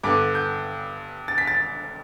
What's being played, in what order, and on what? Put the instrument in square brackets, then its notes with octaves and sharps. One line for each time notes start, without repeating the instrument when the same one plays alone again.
[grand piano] G2 D3 B3 D6
G6
A6
B6
A6